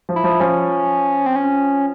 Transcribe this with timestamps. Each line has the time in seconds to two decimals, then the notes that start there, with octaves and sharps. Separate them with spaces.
0.09 F3
0.16 E4
0.24 F3
0.40 F3 C#4
1.26 C4
1.36 C#4